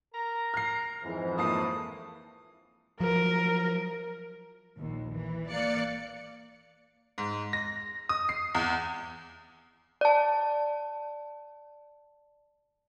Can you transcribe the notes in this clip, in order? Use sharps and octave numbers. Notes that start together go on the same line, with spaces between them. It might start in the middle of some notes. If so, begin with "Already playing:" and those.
A#4 A#5
F6 C7
F2 G#2 E3
A2 A#3 A5 D#6 C7
F3 F#3 A#4
A#1 D#2
E3
A#3 D5 F5 F#6 C#7
G#2
A#6
D#6
C7
E2
D5 A5